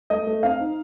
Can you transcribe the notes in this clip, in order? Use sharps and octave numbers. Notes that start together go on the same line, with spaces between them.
A3 D#5
A3
C4 F5
D#4